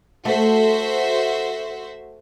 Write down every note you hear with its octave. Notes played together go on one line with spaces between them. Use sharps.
A3 F#4 C5 E5